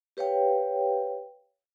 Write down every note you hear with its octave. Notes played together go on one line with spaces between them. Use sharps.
G4 B4 C#5 F5 G5